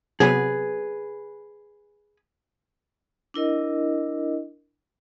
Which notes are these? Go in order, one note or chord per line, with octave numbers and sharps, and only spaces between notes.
C3 F#3 B3 G#4 B4
D4 E4 A#4 D#5